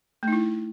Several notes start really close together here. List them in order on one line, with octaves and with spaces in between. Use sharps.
A3 D#4 E4